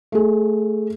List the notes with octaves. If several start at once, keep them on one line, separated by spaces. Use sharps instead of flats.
A3 G#4